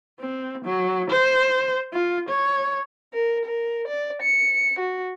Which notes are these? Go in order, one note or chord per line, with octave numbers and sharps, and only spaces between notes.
C4
F#3
C5
F4
C#5
A#4
A#4
D5
C#7
F#4